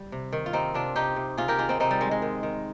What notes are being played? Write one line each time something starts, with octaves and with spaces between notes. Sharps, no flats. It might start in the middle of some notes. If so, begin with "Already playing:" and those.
Already playing: G3
C3
D#3
F4
C3 C4 D#4
C3 D4 F4
C3 D#4 G4
C3
C3 F4 G#4
G4 A#4
D#3 F4 G#4
C4 D#4
C3 C4 D#4
G3
D#3 G#3
G#3
D#3
D#3